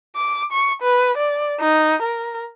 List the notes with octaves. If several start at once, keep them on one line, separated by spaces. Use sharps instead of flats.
D6
C#6
B4
D5
D#4
A#4